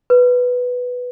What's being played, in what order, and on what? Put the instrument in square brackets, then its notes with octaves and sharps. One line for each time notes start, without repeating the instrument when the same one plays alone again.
[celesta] B4